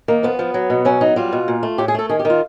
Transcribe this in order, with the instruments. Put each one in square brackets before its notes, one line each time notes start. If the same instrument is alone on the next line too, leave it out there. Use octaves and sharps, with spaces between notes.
[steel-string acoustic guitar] D#3 A#3
F3 B3
F3
F#3
B2
F#3 C#4
F#3 D#4
G3 F4
B2
A#2
A3
A2 G4
G#4
A3 A4
D#3 G#4
G4
D#3 F4